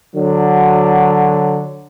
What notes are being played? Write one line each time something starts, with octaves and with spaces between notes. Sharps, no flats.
D3 F#3